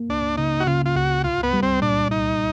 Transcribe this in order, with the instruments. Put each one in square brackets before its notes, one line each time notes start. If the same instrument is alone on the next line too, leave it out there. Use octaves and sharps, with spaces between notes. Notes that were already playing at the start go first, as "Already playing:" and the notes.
Already playing: [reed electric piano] A#3
[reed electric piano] C#2 [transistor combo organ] D4
[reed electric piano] C#3 [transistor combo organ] D#4
[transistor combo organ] F#4
[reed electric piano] C#3 [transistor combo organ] F4
[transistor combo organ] F4
[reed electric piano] C#2 [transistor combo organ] F#4
[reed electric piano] C2 [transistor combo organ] F4
[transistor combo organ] B3
[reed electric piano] G3
[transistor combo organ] C4
[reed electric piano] A#2 [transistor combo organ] D4
[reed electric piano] C2 [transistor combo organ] D#4